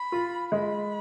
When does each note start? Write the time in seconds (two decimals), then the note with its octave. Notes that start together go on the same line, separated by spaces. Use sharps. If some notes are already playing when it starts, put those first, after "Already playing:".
Already playing: B5
0.12 F4
0.52 G#3 B5